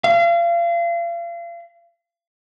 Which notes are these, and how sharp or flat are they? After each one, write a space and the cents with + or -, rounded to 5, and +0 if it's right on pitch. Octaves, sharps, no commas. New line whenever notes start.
F5 -35